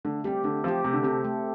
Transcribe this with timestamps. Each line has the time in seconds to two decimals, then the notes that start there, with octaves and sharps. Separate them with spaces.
0.05 D3 A3
0.24 G3 C4 G4
0.44 D3 A3
0.64 F3 C4 G4
0.84 C3 A3
0.93 D3
1.03 C3 C4 A4
1.24 A3